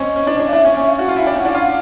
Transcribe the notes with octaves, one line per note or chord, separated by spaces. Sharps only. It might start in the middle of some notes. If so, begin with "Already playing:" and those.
Already playing: C4 C#4 D#5
C#4
D4
D4
F5
D4 E5
C#4
C#4 E5
F5
F#4
F4 F#5
E4
D4 G5
C#4 F#5
D4
F4 F5
F#5